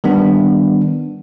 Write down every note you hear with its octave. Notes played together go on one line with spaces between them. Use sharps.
D#3 G3 B3 D4